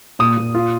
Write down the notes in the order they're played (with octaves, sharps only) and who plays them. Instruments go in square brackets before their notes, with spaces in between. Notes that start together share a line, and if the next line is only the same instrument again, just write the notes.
[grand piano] A#2 D#6
A#2
F4